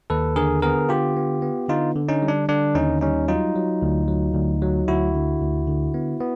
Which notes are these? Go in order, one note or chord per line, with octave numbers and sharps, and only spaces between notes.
D#2 A4 B4
D3 G#4 A#4
B3 G#4 A#4
D3 F4 G4
B3
B3
D3 D#4 F4
D3
C#4 D#4
G3
D4
D3 D4
D#2 C#4 D#4
G3 C#4 D#4
F#3 D#4 F4
F#3
D2
F#3
D2
F#3
D2 E4 F#4
D3
D2
D3
B3
B3